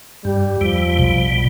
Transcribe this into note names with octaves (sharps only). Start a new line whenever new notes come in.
G2 G3
E2 F3 G3
B1 B2 G3